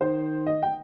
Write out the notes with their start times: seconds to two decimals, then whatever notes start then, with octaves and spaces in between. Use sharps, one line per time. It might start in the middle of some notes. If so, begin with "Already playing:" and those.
0.01 D#3 C5
0.46 D#5
0.62 G5